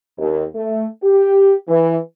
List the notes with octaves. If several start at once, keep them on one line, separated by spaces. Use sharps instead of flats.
D#2
A3
G4
E3